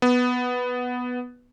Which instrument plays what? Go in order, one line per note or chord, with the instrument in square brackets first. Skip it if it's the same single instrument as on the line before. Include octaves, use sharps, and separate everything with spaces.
[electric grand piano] B3